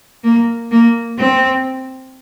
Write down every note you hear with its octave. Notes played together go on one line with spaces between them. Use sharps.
A#3
A#3
C4